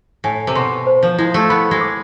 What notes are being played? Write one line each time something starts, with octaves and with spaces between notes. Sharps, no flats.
A2 G#5
C3
B2 C6
C5
F3
G#3 E4
A3
B3 B5
G#3
D6